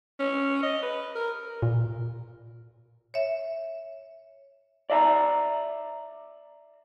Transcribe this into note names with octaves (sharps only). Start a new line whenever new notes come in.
C#4
D#5
B4
A#4
A#2
C#5 E5
D5 E5 A5 A#5